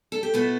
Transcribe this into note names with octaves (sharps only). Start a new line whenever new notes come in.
A4
G4
B2 A3 E4 F4